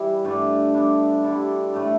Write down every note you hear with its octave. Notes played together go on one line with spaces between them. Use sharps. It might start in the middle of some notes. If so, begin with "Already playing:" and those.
Already playing: E3 G3 E4
G2 D3 A3 D4
D3 B3 D4
D3 G3 E4
A2 A3 E4